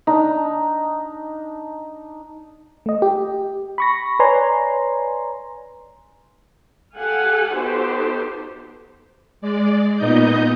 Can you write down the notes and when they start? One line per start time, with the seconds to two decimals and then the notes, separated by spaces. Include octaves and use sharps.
0.07 D4 D#4
2.86 A3 D#5
3.02 G4
3.78 B5 C#6 A#6
4.20 B4 C#5 D5 G#5 A#5 C6
6.97 G4 A4 F5 F#5 G#5
7.54 B3 D#4 F#4 G4 A4 C5
9.41 G#3 D5
9.97 A#2 B3 D#4 D#5 G6